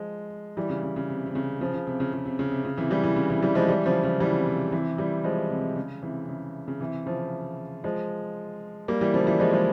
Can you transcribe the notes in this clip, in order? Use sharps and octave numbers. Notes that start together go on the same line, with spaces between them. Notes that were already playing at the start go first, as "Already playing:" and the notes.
Already playing: F3 G#3
E3 G3
C#3
C#3
C#3
C3
C3
C#3
C#3 F3
C#3
C3
C#3
C#3
C3
C#3
C3
C#3
C3 E3
E3 G3
C3 E3
C#3
C3 E3
E3 G3
F3 G#3
E3 G3
C#3 F3
C#3 F3
E3 G3
C3
C3
C3 E3
E3 G3
F3 G#3
C3
C#3
C3 E3
C#3
C#3
C3 E3
C#3 F3
F3 G#3
G3 A#3
E3 G3
C#3 F3
E3 G3
F3 G#3
F3 G#3